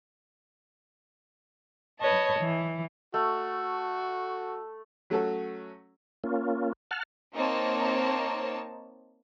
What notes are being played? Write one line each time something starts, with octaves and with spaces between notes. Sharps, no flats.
B4 C#5 D#5 A5
E3
A3 F#4
F#3 A3 C#4 F#4 A4
A#3 C#4 F4
F#5 A5 F6
A#3 C4 D#4 C#5 A5